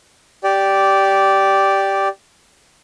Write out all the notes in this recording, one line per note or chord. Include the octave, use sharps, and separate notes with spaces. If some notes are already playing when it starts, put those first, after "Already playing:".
G4 D5